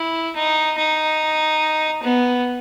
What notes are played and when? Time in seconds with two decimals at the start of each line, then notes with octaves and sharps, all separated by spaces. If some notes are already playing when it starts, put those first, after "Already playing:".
Already playing: E4
0.35 D#4
0.78 D#4
2.03 B3